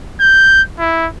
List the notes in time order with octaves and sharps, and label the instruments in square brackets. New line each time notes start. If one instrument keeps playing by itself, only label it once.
[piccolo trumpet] G6
E4